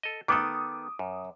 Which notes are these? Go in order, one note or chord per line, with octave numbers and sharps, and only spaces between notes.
A4 D#5
D#3 B3 A4 D6 D#6
F#2